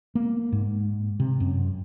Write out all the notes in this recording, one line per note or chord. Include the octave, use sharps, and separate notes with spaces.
A#3
G#2
C3
F#2